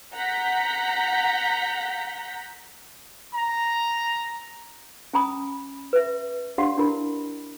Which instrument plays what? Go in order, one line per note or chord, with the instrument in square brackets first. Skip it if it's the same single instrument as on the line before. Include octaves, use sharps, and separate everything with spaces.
[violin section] F#5 A#5 G6 B6
[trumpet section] A#5
[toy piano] C#4 G#5 A#5 B5 D#6
B4 E5
D4 G4 D5 F5 F#5 C6
D4 E4 A#4 B5